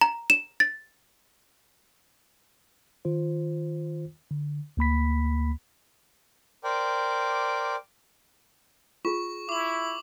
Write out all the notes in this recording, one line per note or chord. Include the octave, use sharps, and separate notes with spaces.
A#5
E7
A6
D#3 F4 C5
D3
D2 A#3 B5 B6
A#4 C5 D5 G5 D6
F4 G#4 C#6
E4 D6 F#7